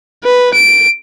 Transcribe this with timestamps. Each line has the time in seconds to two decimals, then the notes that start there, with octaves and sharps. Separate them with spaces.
0.24 B4
0.54 D7